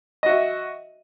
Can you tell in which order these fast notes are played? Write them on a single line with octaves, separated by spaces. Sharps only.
D#5 F#4 E5